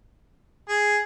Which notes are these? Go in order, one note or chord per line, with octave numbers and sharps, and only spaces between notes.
G#4